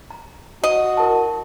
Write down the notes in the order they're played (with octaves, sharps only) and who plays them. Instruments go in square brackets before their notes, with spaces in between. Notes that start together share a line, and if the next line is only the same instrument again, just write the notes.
[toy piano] A#5
[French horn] F#4 [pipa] D#5
[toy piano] E4 A#4 A5